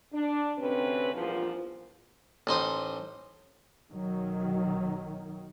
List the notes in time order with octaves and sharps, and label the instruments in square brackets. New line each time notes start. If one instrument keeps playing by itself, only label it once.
[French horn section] D4
D2 C3 C4 C#4 B4
E2 G2 A#2 F3
[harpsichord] A1 D#4 C5 D#6
[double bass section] B1 D#3 F#3